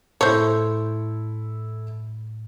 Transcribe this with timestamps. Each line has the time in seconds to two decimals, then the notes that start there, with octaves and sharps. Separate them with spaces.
0.21 A2 E4 A4 C5 C#5 C6 G#6